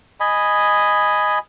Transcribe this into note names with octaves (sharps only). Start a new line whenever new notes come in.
D#5 G#5 B5